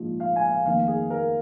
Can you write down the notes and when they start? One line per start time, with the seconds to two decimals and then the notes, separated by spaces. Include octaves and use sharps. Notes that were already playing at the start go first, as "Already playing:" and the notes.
Already playing: A#1 G#2 F3
0.20 F5
0.36 G#5
0.50 F5
0.66 F1 D#2 D#3 F5
0.88 G#4
1.10 A#4